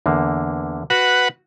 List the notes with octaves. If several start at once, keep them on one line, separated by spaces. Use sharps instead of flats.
E2 D3 A#3
F#4 B4 F#5